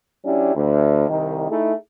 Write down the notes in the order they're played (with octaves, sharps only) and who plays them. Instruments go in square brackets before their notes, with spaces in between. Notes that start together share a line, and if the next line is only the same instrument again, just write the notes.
[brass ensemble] F#3 C#4 D4 E4 G4
D2
C2 D#3
A3 D#4 E4 G#4